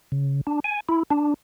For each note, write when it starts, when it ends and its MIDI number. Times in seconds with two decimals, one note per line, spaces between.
0.12 0.41 49
0.47 0.60 62
0.64 0.80 80
0.89 1.03 64
1.11 1.34 62